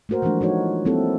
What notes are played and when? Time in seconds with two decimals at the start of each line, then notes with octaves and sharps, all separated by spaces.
0.09 A3 A#3 F#4 A#4 C5
0.22 E3 F3 G#3 A3 D4
0.41 F3 D#4 F#4 C#5
0.85 G3 A#3 C4 E4 G4 A4